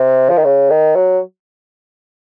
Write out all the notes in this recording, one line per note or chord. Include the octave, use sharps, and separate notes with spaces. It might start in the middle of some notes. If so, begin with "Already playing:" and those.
Already playing: C3
F3
D#3
C#3
D#3
F#3